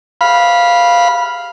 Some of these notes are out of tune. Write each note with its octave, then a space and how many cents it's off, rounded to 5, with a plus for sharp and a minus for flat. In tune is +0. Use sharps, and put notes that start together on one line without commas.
F5 +0 B5 -15